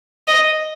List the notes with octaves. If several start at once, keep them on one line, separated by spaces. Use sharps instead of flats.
D#5